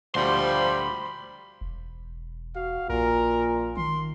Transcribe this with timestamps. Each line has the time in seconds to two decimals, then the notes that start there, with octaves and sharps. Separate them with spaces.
0.15 D2 F3 G3 G4 C5 B5 C6
1.61 E1
2.56 F#4 F5
2.89 A#1 A#2 A#4
3.77 D#3 C6